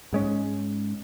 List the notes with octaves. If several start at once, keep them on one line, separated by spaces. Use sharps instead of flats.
G#2 G#3 C#4